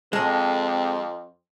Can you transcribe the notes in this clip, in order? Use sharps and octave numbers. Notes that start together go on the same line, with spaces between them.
F2 G#3 C4 A4 A#4